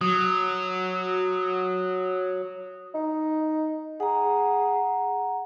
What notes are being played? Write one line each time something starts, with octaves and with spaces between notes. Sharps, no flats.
F#3 D#6
D#4
G#4 F#5 A#5